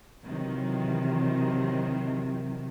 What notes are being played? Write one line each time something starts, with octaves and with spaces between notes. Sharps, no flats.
C3 D#3 E3 F#3